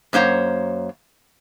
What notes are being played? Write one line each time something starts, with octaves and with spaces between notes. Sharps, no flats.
F#2 A#3 C5 C#5